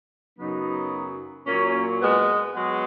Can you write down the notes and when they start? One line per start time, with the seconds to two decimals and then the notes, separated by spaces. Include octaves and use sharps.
0.38 F#2 C#3 F#3 B3 D#4
1.46 A#2 F#3 A#3 C#4
2.01 G#3 B3
2.55 F#3 G#3 B3